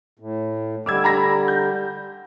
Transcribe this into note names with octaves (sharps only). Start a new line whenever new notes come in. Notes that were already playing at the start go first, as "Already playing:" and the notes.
A2
D3 G3 D6 E6 G#6
A#5 B5 A#6
G6